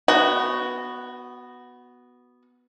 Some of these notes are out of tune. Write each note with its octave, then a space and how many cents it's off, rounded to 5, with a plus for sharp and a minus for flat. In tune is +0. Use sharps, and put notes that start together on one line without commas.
B3 +0 F#4 +0 F#5 +40